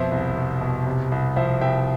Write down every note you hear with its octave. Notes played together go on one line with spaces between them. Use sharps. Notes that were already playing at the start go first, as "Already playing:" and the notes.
Already playing: F2 B2 C5 E5
C2
C2
B2
C3
C2
F3 C5 E5
C2 E5 G5